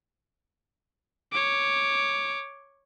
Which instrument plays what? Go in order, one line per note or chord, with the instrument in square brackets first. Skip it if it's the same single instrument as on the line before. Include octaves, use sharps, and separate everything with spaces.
[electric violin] C#5 D6